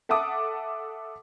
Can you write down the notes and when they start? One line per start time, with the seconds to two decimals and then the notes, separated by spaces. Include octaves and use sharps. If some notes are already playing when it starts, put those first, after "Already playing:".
0.09 A4 E5 F#5 A5 D6 D#6